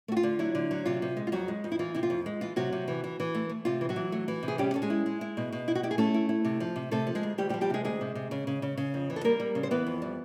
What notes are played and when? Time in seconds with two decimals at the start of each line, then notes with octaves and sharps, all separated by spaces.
0.08 A3 F#4
0.17 F4
0.23 D3
0.39 F#3 E4
0.55 D3
0.71 F#3
0.86 C3 F4
1.02 C3
1.17 G#3
1.27 F4
1.32 F2 F#3 F#4
1.48 G#3
1.64 F2
1.72 E4
1.79 E3 F4
1.95 C3 E4
2.03 F4
2.10 F2
2.26 G#3
2.41 E3 F4
2.56 C3 F#3 F#4
2.73 C3
2.88 E3
3.04 E3
3.20 E3
3.35 A3
3.49 A3
3.65 C3 F4
3.81 E3
3.89 F#3 F#4
3.96 E3
4.12 A3
4.28 E3
4.43 C3
4.48 G#4
4.58 G3 C#4 G4
4.74 C#4 A4
4.82 G#3 G#4
4.90 E4
5.06 G#3
5.21 E4
5.37 B2
5.52 B2
5.68 E4
5.75 F#4
5.83 E4 G4
5.91 G#4
5.98 A3 C#4 A4
6.14 E4
6.29 E4
6.45 C3
6.60 F3
6.76 C3
6.91 C3 A3 A4
7.07 F3
7.15 G#3 G#4
7.23 D2
7.38 D2 G3 G4
7.49 G3 G4
7.54 F3
7.61 G3 G4
7.70 C3 G#3 G#4
7.84 D2 G#3 G#4
8.01 C3
8.15 C3
8.31 C#3
8.47 C#3
8.62 C#3
8.77 C#3
8.94 F2
9.10 E3
9.16 A4
9.24 G3 A#3 A#4
9.40 G3
9.55 C#3
9.63 C5
9.71 E3 B3 B4
9.86 F2
10.02 G3